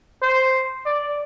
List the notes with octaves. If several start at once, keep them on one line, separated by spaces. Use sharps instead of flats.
C5
D5